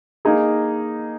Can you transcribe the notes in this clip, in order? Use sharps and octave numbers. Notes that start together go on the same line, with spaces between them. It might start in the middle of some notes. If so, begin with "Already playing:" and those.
A#3 D#4 G#4